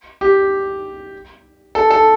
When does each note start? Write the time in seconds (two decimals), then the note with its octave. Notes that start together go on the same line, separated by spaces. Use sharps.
0.21 G4
1.75 A4
1.91 A4